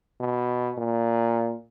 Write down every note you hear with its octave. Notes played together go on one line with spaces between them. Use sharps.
B2
A#2